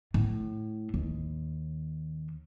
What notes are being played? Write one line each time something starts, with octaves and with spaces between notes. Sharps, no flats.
A2
D#2